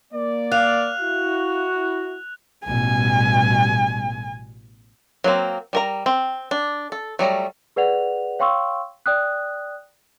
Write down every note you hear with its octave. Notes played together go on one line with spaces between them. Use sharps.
A#3 D5
F5 F#6 F7
E4 F#4
A1 B2 G3 G#5
F#3 A#3 C4
G3 A#4 A#5
C4
D4
A4
F#3 G3 A3 A#5
G#4 B4 D5 F#5 F7
C#5 F5 G5 C6 C#6 E6
D5 G5 D#6 F#6